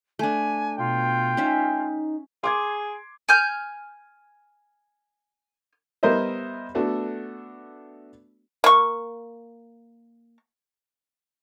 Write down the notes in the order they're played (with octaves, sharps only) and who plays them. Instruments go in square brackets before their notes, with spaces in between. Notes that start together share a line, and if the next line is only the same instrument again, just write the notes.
[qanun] A3 D4 [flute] G#5
[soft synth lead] B2 [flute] F4 [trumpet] G5
[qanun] C#4 E5 [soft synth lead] D#4
[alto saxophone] G#4 [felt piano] C6 D6 G#6
[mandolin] G#5 F6 G6
[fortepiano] G3 B3 A#4 C5 D#5 E5
A3 B3 D4 F#4 A4
[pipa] A#3 C#6